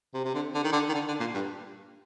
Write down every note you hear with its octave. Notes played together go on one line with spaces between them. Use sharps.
C3
C3
D3
D3
D#3
D3
D#3
D3
D3
A#2
G2